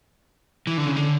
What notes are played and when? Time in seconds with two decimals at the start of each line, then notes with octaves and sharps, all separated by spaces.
0.67 E3
0.77 D3
0.86 C#3
0.96 D3